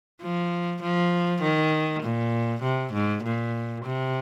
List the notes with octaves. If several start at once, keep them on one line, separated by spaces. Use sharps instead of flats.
F3
F3
D#3
A#2
C3
G#2
A#2
C3